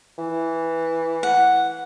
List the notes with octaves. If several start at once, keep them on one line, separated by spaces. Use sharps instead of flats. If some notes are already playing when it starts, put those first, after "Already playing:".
E3
F#5